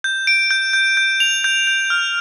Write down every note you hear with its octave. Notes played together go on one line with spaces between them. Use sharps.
G6
D7
G6
G6
G6
F7
G6
G6
F6